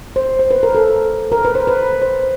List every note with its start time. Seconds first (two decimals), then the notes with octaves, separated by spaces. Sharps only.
0.16 C5
0.39 C5
0.51 B4
0.63 A#4
0.75 A4
1.32 A#4
1.45 B4
1.55 C5
1.67 B4
2.02 C5